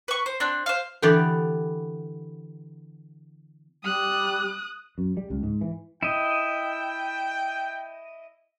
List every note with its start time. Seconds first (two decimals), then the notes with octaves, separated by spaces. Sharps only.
0.08 B4 C#6
0.26 C5
0.40 C4 D4
0.66 C5 F5
1.02 D3 E3 B3 G4 D5
3.84 G3 D#6 F#6
4.98 F#2
5.17 G3
5.30 C#2
5.43 G#2
5.61 E3
6.03 E4 D#5 G5